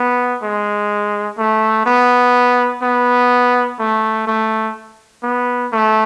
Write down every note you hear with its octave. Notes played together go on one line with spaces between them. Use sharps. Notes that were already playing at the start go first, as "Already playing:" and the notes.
Already playing: B3
G#3
A3
B3
B3
A3
A3
B3
A3